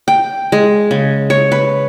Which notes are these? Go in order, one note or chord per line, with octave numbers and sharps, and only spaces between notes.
G5
G#3
C#3
C#5
B4